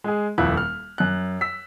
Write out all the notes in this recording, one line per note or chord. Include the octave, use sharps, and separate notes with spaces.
G#3 G#4
D#1 F2 E4 F4 F#6
F6
F#2 F#6
E6 B6